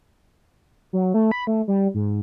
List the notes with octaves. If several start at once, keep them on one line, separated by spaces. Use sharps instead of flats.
F#3
A3
B5
A3
G3
G#2